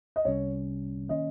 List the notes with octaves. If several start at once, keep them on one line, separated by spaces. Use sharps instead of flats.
D#5
C2 C3 G3 C#4 C#5
D#3 A#3 C#4 D#5